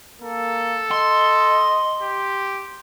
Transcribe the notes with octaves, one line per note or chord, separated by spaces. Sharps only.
A#3 A4
D#5 C6
G4